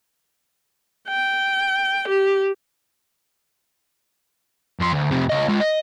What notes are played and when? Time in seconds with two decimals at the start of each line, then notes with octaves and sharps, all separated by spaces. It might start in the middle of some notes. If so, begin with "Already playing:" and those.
1.08 G5
2.08 G4
4.80 F2 C6
4.93 D2
5.11 F2 C3
5.29 C#2 D#5
5.48 G#3 F4
5.60 D#5